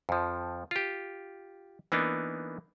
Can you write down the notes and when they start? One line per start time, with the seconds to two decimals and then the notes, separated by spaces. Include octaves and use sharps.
0.09 F2 F3
0.71 F4 G4
1.92 E3 A#3 B3 D4 D#4